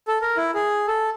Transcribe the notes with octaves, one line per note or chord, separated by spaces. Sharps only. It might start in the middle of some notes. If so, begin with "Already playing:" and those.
A4
A#4
E4
G#4
A4